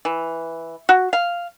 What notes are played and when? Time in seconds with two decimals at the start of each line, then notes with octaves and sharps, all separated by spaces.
0.05 E3
0.89 F#4
1.13 F5